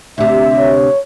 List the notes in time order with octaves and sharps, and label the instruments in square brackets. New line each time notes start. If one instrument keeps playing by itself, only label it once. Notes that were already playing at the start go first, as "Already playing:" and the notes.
[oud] D2 C3 [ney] E5
[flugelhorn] C#5